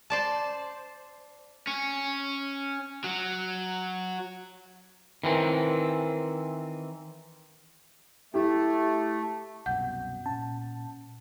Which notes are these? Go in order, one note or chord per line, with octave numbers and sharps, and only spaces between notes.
C5 D5 A5
C#4
F#3
D#3 E3 C4
A3 E4 G4
C2 F#2 B2 F#5 G6
A#2 C#4 A5